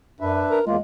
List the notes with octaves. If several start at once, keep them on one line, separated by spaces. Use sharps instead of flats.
F#2 D4 B4 E5
A#4
E2 G#3 A#3 F4